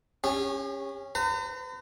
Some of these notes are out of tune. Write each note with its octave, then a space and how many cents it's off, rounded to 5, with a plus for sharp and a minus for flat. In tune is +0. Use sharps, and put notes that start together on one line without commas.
C#4 -10 G4 +45
B4 +45 A#5 -35